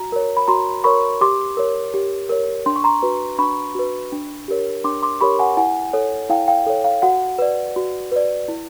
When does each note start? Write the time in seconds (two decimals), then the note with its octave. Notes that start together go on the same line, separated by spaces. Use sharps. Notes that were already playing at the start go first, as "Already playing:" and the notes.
Already playing: F#4 A#5
0.12 A#4 C#5
0.37 B5
0.48 F#4 A#5 C6
0.84 A#4 C#5 B5 C#6
1.21 G4 C6 D6
1.57 A#4 C#5
1.94 G4
2.29 A#4 C#5
2.66 D4 C6
2.76 C#6
2.84 A#5 C6
3.03 F#4 B4
3.38 D4 B5 C#6
3.75 F#4 B4
4.12 D4
4.48 G4 A#4 C#5
4.84 D4 C6 D6
5.02 C6 D6
5.21 G4 A#4 C#5 B5 C#6
5.39 F#5 G#5
5.57 E4 F#5 G#5
5.93 A4 C#5
6.29 E4 F5 G5
6.48 F5 G5
6.67 A4 C#5
6.84 F5
7.02 F#4 F#5
7.38 B4 D5
7.76 F#4
8.12 B4 D5
8.48 E4